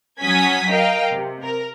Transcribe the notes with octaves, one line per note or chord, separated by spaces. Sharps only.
F#3 C#4 F#4 D#6 G#6 B6
A#4 D#5 F5 G5
C3
A#4